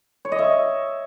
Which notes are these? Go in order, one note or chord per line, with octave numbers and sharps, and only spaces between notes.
C#5
D#5
E5